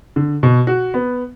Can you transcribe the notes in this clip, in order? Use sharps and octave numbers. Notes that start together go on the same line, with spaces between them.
D3
B2
F#4
B3